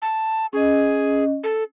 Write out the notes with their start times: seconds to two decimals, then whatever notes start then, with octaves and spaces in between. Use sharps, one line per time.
0.02 A5
0.53 C#4 G#4 D#5
1.44 A4